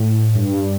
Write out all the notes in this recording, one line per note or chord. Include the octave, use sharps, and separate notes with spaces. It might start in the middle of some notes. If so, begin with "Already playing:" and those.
Already playing: A2
G2